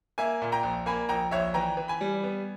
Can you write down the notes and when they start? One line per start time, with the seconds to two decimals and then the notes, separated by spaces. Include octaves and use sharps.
0.18 A#3 E5 G#5
0.42 A#2
0.52 G5 A#5
0.63 A#1
0.86 A#3 G#5 B5
1.09 A#1 G5 A#5
1.31 A#1 C#5 E5
1.54 E3 G5 A#5
1.77 E3
1.88 G#5 B5
2.01 G3
2.23 B3